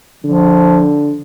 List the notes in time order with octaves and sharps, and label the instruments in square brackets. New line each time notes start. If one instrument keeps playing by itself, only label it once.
[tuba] D3 [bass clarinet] F3